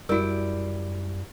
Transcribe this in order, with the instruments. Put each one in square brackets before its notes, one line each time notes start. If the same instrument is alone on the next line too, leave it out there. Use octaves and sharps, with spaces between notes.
[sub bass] F#2 [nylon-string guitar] G3 E4 [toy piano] F#4 A#4